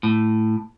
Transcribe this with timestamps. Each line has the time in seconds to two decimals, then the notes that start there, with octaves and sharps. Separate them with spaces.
0.03 A2